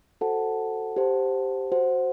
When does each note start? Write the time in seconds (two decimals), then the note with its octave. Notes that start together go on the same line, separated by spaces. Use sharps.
0.21 F#4 A4 C5 F#5 A5
0.96 G4 C5 F#5 A5
1.72 F#4 C5 F#5